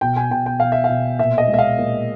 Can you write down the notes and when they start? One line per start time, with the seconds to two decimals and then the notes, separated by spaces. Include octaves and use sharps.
0.01 B2 G5
0.16 G#5
0.31 B2 G5
0.46 G5
0.60 B2 F5
0.72 E5
0.84 F5
0.89 B2
1.19 A#2 E5
1.38 D#5
1.48 G#3
1.54 E5
1.58 F5
1.78 A#2